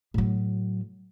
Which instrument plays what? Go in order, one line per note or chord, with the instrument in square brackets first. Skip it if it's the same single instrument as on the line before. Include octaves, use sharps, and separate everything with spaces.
[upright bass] A2 F#3